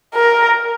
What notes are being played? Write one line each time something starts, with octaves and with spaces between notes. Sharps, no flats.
A#4